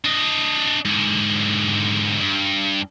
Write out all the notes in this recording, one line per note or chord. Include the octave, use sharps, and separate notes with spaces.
D4 D#5
G#2 D3
G2